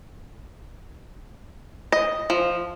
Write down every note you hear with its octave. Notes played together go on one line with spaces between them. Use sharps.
D#5
F3